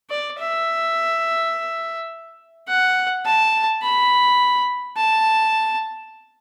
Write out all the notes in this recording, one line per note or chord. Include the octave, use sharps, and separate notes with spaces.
D5
E5
F#5
A5
B5
A5